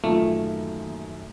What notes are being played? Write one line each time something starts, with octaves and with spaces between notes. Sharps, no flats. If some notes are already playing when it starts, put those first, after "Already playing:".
F#2 A2 D#3 E3 A3 A#3 F4